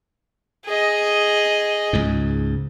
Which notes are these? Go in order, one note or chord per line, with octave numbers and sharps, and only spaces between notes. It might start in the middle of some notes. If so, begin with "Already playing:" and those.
G#4 D#5
C#2 G#2